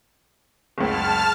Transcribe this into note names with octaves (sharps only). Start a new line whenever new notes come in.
F#1 C#2 A5 F6